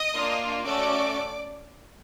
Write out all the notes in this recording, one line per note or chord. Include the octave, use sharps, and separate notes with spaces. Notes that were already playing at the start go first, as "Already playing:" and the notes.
Already playing: D#5 D#6
A#3 D4 F4
A3 C#4 F#4 A4 D5 D6